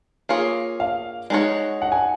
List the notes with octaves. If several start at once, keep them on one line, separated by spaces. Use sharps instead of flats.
A#3 F4 G#4 C#5
F5
G#3 D#4 F#4 C#5
F#5
G#5